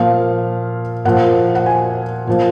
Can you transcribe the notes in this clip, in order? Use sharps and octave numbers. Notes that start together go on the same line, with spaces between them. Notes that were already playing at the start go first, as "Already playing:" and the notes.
Already playing: A#2 F3 F5
A#2 F3 F#5
F#5
G#5
A#2 F3